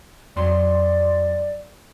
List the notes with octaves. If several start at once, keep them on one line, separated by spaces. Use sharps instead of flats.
F2 F#3 D5 C6